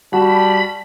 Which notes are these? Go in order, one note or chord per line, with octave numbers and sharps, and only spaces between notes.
G3 F#4 A5 B5